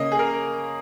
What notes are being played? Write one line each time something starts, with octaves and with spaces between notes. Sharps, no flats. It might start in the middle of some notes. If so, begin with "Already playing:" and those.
Already playing: C#3 A#3 C#4 D#5
G#4
A#4